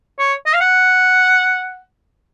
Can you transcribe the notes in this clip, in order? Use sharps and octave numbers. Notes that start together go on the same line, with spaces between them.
C#5
D#5
F5
F#5